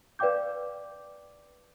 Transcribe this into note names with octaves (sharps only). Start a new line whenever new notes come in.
B4 D5 F5 G5 D6 G6